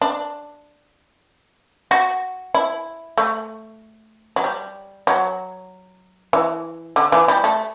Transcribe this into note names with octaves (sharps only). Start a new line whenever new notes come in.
D4
F#4
E4
A3
F#3
G3
F#3
E3
D3
E3
G3
A3